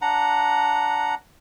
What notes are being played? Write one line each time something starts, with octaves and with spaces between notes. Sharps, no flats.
D4 F#5 A#5